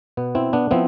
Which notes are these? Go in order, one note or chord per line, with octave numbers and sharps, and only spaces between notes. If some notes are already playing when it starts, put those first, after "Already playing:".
B2 B3
C4 E4
B3 D4
F3 B3 C4 E4